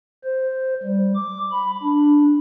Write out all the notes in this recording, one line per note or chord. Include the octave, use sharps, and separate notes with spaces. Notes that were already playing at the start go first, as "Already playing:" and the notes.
C5
G3
D6
B5
D4